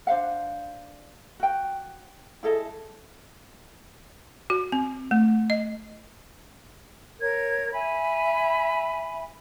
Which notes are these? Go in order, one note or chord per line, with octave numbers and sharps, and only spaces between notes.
D4 C5 F5 F#5
F#4 G5
E4 G#4 A4 D#5
F#4
C4
A3
D#5
A#4 C#5 G#6
E5 G#5 B5